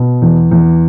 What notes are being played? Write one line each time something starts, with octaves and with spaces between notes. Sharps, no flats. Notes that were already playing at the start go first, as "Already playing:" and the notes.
Already playing: B2
E2
E2